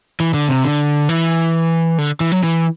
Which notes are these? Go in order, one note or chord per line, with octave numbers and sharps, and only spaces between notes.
E3
D3
C3
D3
E3
D3
E3
F#3
E3